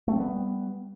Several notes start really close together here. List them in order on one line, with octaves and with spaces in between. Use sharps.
A3 C4 G3 B3